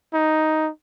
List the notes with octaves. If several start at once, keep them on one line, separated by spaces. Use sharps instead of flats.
D#4